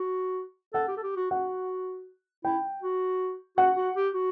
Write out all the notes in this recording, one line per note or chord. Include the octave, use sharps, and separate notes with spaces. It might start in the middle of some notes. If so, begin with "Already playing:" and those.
Already playing: F#4
A4 F#5
G4
A4
G4
F#4
F#4 F#5
E4 G5
F#4
F#4 F#5
F#4
G4
F#4